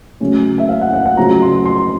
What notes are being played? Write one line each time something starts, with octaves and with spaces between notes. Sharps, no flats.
C#3 F#3 A3 C#4
E5
F5
F#5
F#5
F#5
C#3 F#3 A3 C4 F4 A#5
C6
C6